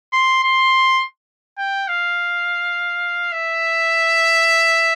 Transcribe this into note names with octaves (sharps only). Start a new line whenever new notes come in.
C6
C6
G5
F5
E5